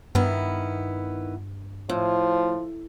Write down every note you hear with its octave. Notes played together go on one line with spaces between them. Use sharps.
G2 D#3 B3 E4
A2 F3